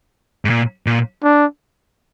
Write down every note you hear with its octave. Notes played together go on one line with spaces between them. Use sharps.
G#2
A#2
A#2
D4